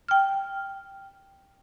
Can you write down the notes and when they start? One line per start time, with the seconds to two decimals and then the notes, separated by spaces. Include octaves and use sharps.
0.08 G5 F6